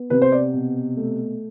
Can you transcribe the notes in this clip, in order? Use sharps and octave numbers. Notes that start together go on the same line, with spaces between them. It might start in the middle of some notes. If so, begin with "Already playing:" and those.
Already playing: B3
C3 B4
C5
D5
B2
A3